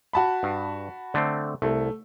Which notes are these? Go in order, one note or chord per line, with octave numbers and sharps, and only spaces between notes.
F#4 A5 B5
G2
D3 A3 C4
C2 A3